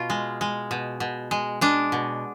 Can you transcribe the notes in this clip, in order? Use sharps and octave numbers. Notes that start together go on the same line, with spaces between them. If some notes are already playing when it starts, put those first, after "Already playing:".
Already playing: B2 F4
G#3
G#3
B2
B2
G#3
G#3 D4
B2